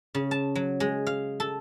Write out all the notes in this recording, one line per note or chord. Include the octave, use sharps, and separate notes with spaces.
C#3
A5
F#3
G#3
F5
A4